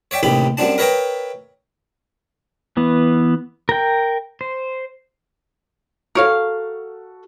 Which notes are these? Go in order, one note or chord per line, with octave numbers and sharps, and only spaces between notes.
C#5 D5 E5 G5
A1 D#2 C3 D#4 G4 B5
F#2 F#3 G3 C4 D4 A5
A#4 B4 C#5 D#5 E5 G5
E3 B3
A#4 G5
C5
F#4 A4 A#4 C#5 F5